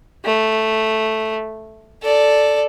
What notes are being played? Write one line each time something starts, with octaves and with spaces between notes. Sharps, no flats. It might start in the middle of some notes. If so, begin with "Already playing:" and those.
A3
A4 D5